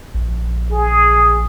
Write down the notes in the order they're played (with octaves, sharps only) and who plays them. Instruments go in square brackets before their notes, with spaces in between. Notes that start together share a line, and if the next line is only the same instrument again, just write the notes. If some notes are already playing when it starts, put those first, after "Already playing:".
[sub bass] A#1
[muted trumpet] G#4